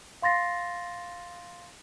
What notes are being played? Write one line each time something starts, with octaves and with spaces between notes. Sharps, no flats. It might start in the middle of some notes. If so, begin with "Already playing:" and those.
F5 C6 A6 A#6 C7